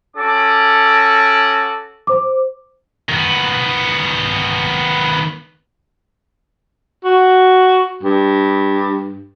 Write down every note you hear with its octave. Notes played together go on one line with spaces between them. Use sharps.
C#4 F#4 A4 D6
C5 D6
D#3 B3
F#4
G2